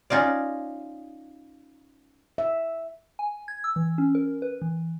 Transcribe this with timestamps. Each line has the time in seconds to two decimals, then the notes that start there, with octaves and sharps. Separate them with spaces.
0.10 C#4 D#4 F4 D5
2.38 E5
3.19 G#5
3.48 G#6
3.64 E6
3.76 E3
3.98 C#4
4.15 A#4
4.42 B4
4.62 E3